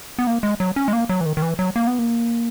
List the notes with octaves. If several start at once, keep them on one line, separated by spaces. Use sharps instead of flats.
B3
A#3
G#3
F#3
C#4
G#3
A#3
F#3
E3
D#3
D#3
E3
F#3
A#3
B3
A#3